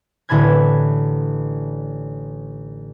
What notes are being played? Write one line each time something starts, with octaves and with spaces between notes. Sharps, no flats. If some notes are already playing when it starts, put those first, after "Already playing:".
A1 D3 A4 B5 G#6